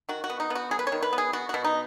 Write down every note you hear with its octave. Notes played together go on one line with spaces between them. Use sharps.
D#3 F#4
F#4
B3
D#4
B3
F#4
F#3 G#4
B4
C#5
D#3
B4
B3
G#4
B3 F#4
B2 F#4
D#4